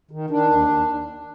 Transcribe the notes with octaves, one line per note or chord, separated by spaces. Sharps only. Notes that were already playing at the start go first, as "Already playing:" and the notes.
D#3
D#3 D4
D#2